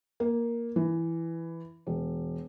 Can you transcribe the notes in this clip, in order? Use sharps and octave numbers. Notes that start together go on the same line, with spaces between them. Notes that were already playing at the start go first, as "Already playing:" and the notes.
A#3
E3
E1